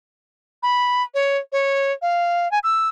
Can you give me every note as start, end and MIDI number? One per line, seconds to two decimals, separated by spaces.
0.63 1.03 83
1.14 1.37 73
1.52 1.92 73
2.02 2.50 77
2.51 2.59 80
2.63 2.88 88